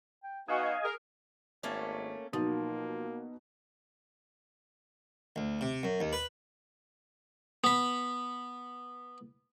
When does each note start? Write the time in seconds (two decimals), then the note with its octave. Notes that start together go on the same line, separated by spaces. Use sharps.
0.23 G5
0.48 B3 D#4 F#4 D#5 F5 G#5
0.84 G#4 A#4
1.63 G#1 A3 A#3 C#4
2.33 B2 F3 F#3 A#3 D#4
5.36 D2
5.61 C3
5.83 F#2
6.00 D#2
6.13 B4
7.64 B3 B5